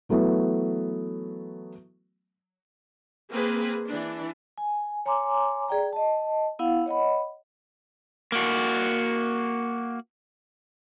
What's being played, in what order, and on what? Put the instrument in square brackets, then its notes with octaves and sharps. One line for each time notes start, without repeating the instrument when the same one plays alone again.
[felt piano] E3 F#3 A3 B3
[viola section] A#3 C4 G#4 B4
E3 D4
[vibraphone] G#5
C#5 G#5 A#5 C6 D6
G#4 D5 G5 A#5
D#5 A5
B3 E4 F5 F#5
C#5 D#5 F#5 B5
[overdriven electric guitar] A#3 F#4